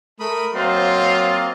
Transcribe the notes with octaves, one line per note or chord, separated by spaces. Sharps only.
A3 A#4 B5 D#6
F#3 A#3 C4 F4 C5 D#5